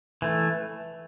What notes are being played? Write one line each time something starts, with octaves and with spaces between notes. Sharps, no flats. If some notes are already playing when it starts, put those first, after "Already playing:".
E3 A3